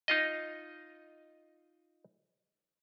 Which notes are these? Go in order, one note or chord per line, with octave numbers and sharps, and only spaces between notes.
D#4 F4 D#5